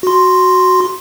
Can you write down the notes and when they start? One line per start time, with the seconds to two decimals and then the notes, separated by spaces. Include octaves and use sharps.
0.03 F#4 C6